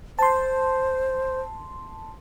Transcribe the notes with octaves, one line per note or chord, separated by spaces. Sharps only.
C5 A5 C6